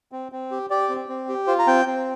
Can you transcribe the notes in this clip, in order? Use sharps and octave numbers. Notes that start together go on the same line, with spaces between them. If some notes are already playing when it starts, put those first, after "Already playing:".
C4
C4
G4
G4 D5
C4
C4
G4
F4 C5
A#5
C4 G5
C4